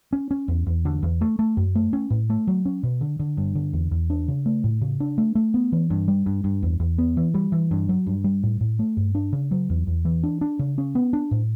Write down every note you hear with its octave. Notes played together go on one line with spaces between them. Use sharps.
C#4
C#4
E2
E2
D3
E2
A3
A3
F#2
A3
C#4
A2
A3
F#3
C#4
B2
D3
D3
G2
D3
E2
E2
D4
C#3
A3
A2
C#3
D4
A3
A3
B3
E3
G2
G3
G2
G2
E2
E2
B3
E3
G3
E3
G2
F#3
G2
G3
A2
A2
A3
G2
D4
C#3
F#3
E2
E2
E3
D4
D4
C#3
C#4
B3
D4
A2